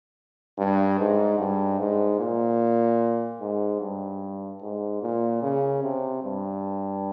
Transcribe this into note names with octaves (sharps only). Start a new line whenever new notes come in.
G2
G#2
G2
G#2
A#2
G#2
G2
G#2
A#2
C#3
C3
G2